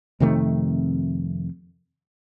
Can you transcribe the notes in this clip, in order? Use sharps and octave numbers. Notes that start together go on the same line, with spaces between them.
F2 C3 D#3 A3